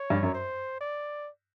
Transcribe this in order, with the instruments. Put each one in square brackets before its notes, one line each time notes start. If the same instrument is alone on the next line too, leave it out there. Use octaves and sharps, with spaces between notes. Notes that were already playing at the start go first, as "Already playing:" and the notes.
Already playing: [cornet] C#5
[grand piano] G2
F#2
[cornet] C5
D5